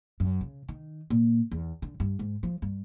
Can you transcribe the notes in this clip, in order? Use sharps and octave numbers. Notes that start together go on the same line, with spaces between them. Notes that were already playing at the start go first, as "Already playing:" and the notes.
F#2
C#3
D#3
A#2
E2
D3
G2
G#2
F3
G2